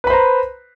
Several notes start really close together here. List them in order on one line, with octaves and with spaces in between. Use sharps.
B4 B5 C5 A#5